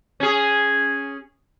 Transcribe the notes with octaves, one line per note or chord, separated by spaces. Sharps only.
C#4 G#4